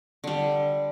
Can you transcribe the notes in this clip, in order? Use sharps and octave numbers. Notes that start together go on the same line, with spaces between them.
D3 G3